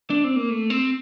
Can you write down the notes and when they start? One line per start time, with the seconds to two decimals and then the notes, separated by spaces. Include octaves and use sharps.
0.10 D4
0.24 C4
0.36 A#3
0.50 A3
0.70 C4